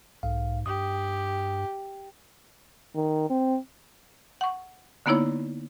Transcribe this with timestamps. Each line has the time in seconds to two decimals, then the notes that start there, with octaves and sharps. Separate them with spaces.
0.23 B1 G#2 F5
0.66 G2 G4 D#6
2.95 D#3
3.30 C4
4.41 F#5 C#6
5.06 D3 A#3 B3 D#4 E4 C#5